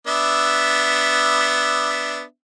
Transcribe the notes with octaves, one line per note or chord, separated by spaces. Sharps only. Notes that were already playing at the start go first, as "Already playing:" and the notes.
B3 D4 E5